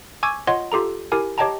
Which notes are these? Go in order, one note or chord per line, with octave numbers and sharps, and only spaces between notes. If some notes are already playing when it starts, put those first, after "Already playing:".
G#5 C#6 D6 E6 G#6
F4 C#5 D#5 F#5 C6
F4 G4 A4 A#5
E4 G4 A#4 G#5
G4 C#5 D#5 G5 A5 A#5